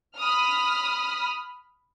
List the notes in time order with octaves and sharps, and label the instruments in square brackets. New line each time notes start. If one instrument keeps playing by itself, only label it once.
[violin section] B5 D#6 F6